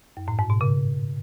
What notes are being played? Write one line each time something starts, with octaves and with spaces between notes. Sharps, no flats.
F#2
A2
G#2
B2
C#3